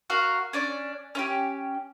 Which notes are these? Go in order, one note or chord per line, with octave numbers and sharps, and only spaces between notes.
F#4 A#4 F5
C#4 D4 D5
C#4 F4 G4